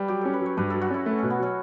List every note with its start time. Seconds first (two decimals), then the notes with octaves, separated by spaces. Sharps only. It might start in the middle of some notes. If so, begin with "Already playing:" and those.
Already playing: G3 B4
0.08 F#3 G4
0.21 C#4 A4
0.33 B4
0.41 F#3
0.46 C#5
0.57 G2 B4
0.70 F#3 A4
0.81 F#4
0.90 C#4 E4
1.06 A3
1.19 B2 C#4
1.30 B3
1.39 F#3 C#4